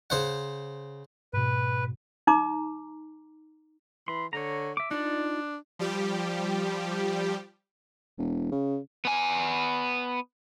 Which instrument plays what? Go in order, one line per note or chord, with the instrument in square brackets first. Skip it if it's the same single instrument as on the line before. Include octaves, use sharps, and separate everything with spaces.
[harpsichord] C#3 C5 F#5
[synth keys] G#2 B2 [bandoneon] B4
[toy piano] D#4 A#5 D6
[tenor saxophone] E3 [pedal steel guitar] B5 C6
[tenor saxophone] D3 [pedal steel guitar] C#5 A#5
[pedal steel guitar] E5 D6
[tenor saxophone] D4 [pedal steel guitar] D#4 F4 D5
[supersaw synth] F3 G3 G4
[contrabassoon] E1
C#3
[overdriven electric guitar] B3 G#5